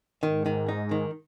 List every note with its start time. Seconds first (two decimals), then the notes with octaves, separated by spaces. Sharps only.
0.23 G#2 D#3
0.46 D#3
0.69 D#4
0.91 D#3